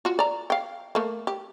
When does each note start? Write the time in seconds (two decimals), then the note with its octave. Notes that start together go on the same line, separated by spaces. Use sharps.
0.05 F4 F#4
0.19 D5 A#5
0.50 F5 G5
0.95 A3 A#3
1.27 G4